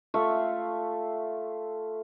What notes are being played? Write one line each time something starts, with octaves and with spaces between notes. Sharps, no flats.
A3 F4 E5 C#6